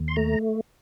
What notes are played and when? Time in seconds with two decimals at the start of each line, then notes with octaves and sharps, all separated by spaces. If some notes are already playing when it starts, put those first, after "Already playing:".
Already playing: D#2
0.08 C6
0.16 A3 A#5